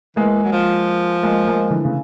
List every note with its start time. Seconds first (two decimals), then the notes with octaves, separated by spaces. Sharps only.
0.16 E3 G#3 A#3
0.44 F#3
0.52 F3
1.23 G#3 A#3
1.47 G#3 A#3
1.70 D3 E3
1.85 C#3